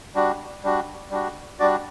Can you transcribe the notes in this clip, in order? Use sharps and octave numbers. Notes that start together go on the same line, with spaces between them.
G3 D4 F#4
G3 D4 F#4
G3 D4 F#4
G3 D4 F#4 D5